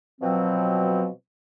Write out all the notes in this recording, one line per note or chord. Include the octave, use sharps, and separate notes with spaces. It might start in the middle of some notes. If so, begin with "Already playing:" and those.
B2 F3 F#3 C4